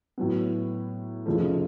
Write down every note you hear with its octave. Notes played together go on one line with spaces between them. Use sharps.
A2 F#3 B3
F1 F2 C#3 F3 A3